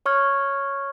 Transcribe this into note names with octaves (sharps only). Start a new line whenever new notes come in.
C#5 C#6 F6 G#6